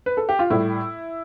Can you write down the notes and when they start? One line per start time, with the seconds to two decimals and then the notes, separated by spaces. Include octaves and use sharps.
0.06 B4
0.17 A4
0.29 G4
0.39 F4
0.50 A2 G3 E4